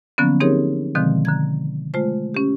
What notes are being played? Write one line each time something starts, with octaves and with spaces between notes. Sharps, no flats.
D3 F3 F#3 A#3 B3 C#4
C4 D#4 G4 G#4 A#4 C#5
B2 D3 D#3 F3 G#3 C4
D3 A#5 G#6
G#3 A3 F4 C5
C#4 G4